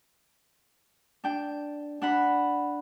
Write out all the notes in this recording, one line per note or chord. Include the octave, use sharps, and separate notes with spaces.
D4 G5
D4 F#5 B5